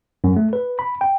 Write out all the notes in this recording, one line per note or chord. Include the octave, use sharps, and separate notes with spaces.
F#2
A3
B4
B5
G5